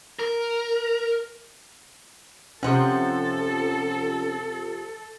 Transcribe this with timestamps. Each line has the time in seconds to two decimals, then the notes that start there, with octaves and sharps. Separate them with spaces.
0.19 A#4
2.63 C3 F3 C#4 A4 F#5